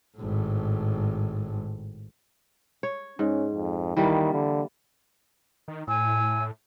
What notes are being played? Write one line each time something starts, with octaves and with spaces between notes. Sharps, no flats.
G#1 A2
C#5
G#2 C#4
F2
D#3 E3 G3 A#3
D3
D#3
A2 G#5 E6